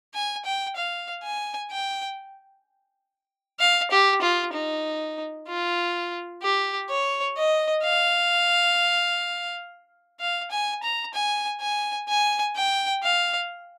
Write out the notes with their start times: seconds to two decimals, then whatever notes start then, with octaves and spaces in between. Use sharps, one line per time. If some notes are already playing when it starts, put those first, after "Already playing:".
0.14 G#5
0.45 G5
0.76 F5
1.23 G#5
1.71 G5
3.59 F5
3.91 G4
4.22 F4
4.54 D#4
5.48 F4
6.42 G4
6.90 C#5
7.37 D#5
7.84 F5
10.20 F5
10.51 G#5
10.83 A#5
11.14 G#5
11.61 G#5
12.08 G#5
12.56 G5
13.03 F5